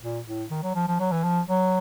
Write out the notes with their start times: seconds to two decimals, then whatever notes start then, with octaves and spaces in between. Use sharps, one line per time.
0.02 A#2
0.27 A2
0.50 D#3
0.63 F#3
0.75 F3
0.88 F3
1.00 F#3
1.12 E3
1.24 F3
1.49 F#3